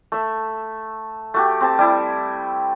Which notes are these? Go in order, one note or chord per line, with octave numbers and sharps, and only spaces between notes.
A3 E5
A3 F#4 G4
C4 G4 A5
G3 E4